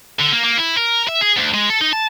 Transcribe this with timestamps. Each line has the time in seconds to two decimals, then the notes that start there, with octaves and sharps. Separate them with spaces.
0.19 D3
0.32 A#3
0.44 A#3
0.57 E4
0.77 A#4
1.08 E5
1.21 G#4
1.37 D2
1.54 G#3
1.70 A4
1.81 D#4
1.93 A5